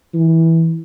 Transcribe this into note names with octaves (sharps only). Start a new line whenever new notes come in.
E3